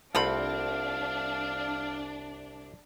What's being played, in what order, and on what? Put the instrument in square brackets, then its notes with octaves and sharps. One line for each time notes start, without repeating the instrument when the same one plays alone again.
[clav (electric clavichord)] C2 C4 F#5 [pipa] A3 F4 B5 [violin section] D4 [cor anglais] F5